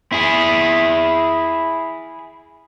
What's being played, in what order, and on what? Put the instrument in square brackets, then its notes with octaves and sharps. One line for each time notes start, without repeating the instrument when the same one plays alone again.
[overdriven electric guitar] E4 G#4